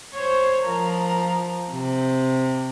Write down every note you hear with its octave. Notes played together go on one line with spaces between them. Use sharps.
C5 C#5
F3 A#4
C3